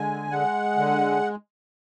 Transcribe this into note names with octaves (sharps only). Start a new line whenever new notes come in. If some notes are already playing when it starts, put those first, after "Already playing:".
Already playing: D3 G#3 G#5
G#3 F#5
D3